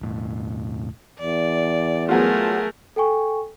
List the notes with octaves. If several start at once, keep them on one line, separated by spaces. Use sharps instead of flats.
E1 A2
E2 D5
F#3 A3 B3 F4 G#4 A#4
A4 G5 G#5 C#6